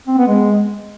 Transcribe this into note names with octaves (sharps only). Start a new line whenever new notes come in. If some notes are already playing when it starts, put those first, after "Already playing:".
C4
B3
G#3